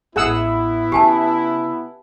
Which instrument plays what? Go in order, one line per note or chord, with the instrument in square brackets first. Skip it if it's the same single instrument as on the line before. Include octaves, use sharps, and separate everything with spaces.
[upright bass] A1 [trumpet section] B3 E4 [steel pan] G#4 F#5 E6
[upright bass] C#3 [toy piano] G4 G#5 A5